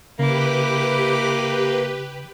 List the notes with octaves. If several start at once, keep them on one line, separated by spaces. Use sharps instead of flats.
C#3 A#3 E4 G4 B4 D6